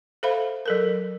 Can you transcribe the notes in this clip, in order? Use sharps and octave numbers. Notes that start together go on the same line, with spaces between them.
A4 C5 E5 F5 B5
F#3 A4 A#4